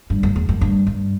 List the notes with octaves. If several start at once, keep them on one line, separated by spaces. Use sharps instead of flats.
G2
F#2
E2
F#2
G2
G2